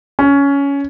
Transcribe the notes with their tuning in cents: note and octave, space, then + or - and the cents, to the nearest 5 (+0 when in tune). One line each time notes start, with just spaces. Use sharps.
C#4 +15